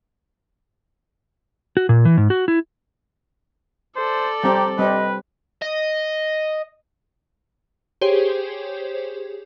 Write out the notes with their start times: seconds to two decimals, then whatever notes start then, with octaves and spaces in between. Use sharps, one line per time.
1.77 F#4
1.89 A#2
2.05 E3
2.17 G#2
2.30 F#4
2.48 E4
3.96 A4 C5 D5
4.43 G3 C4 G4 A#5
4.79 G3 C4 B4 D#5
5.62 D#5
8.01 G4 G#4 C5 C#5